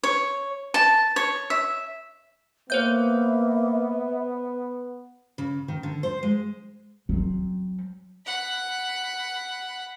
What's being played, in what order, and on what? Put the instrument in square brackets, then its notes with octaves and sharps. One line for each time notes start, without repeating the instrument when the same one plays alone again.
[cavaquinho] C#5
A5
C#5
E5
[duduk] A#3 [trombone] B3 [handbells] C5 C#5 G6 [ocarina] E5
[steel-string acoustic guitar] C#3
D#3
D3
C5
G#3
[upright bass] F#3 C4
[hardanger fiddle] F#5 B5